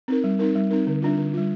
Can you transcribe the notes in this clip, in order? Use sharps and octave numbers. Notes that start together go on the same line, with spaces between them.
C4 D#4 A#4
G3
C4 D#4 A#4
G3
C4 D#4 A#4
D3
G3 D4 F4
D3
G3 D4 F4